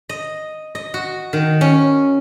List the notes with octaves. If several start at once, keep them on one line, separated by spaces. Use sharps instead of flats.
D#5
D#5
F#4
D#3
C#4